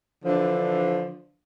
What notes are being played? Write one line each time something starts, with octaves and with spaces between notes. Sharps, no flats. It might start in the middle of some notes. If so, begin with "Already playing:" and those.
D3 E3 F3 D4